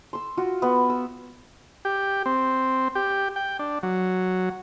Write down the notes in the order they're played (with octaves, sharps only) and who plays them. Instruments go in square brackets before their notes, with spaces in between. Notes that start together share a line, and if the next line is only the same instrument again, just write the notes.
[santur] C6 E6
F4 F#4
B3
E6
[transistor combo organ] G4
C4
G4
G5
D4
F#3